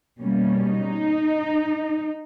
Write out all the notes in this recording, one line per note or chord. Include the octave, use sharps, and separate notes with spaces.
B2 G3 A#3 C#4
D#4